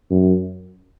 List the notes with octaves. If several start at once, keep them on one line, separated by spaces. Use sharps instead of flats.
F#2